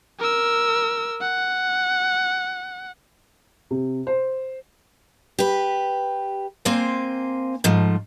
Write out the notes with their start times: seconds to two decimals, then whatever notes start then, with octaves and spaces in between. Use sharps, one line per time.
0.19 A#4 E6
1.21 F#5
3.71 C3
4.07 C5
5.39 G4 B4
6.65 A#3 C4 C5 G#5
7.64 G#2 F3 A3